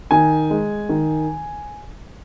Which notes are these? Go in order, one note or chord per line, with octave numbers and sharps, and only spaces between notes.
D#3 G#5
G#3
D#3